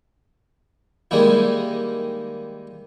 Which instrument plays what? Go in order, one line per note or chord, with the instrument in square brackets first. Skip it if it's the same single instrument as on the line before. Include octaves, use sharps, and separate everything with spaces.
[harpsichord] D#3 G3 G#3 A#3 E4